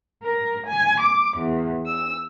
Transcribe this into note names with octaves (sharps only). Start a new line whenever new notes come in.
A#4
G#5
D6
E2
E6